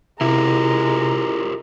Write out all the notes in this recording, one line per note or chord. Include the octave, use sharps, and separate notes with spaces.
C3 G#3 E4 F4 G4 A#4 A#5